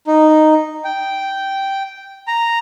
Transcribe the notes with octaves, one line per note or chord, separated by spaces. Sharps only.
D#4
G5
A#5